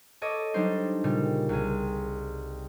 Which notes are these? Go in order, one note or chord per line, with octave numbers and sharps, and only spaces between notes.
A4 C#5 D#5 D6
F#3 G3 D4 D#4 C5
A#2 C#3 G3
C2 G#4